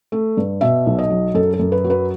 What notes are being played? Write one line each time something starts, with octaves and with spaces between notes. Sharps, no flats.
A3
G2
B2 E5
B1
D#5
F#3
F#2 A4
A4
F#2
B4
F#3
B4